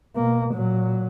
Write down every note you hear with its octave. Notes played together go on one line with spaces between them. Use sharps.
B2 A#3
A#2 F#3